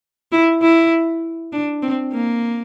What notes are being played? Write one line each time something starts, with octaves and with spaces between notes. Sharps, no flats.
E4
E4
D4
C4
A#3